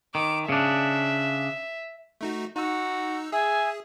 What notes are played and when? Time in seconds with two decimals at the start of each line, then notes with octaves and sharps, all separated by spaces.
0.15 D#3 D6
0.49 C#3 D4 E5
2.21 A3 D#4 F#4
2.56 D#4 F#4 E6
3.32 G#4 E5 G#5